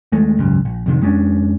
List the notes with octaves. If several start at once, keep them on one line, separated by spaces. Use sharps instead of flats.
D#2 G#3 A3
G#1 C#2 F#2
A#1
F2 C3 D#3
F2 G#3 C#4 D4